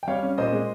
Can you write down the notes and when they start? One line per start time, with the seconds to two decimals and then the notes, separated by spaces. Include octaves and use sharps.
0.03 G5
0.08 G3 C#5 F5
0.23 C#4
0.38 A#2 C5 D#5
0.52 G#3